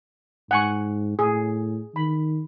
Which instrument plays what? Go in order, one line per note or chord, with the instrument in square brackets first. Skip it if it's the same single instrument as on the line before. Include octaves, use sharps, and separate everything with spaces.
[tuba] G#2 [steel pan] F#5 G#5 C#6
[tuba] A2 [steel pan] G#4
[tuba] D#3 [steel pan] B5